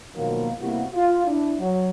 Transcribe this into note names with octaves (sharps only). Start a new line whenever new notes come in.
B2 D#3 F3 F#3 A#3
C3 G3 A#3 B3 E4 F#4
F4
D4 E4
F#3